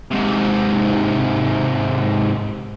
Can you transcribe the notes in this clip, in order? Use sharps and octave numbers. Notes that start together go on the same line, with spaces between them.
G#2 C3